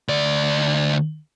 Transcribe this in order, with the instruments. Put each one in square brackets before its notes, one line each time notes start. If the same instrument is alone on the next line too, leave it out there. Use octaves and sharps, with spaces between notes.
[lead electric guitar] D2 D5